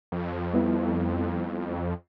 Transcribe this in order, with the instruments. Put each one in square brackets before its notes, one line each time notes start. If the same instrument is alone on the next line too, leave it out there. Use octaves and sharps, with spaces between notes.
[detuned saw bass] F2
[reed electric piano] G3 B3 E4